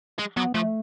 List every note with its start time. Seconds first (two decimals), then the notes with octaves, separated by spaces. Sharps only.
0.19 G#3
0.37 F#3 B3
0.54 F3 A3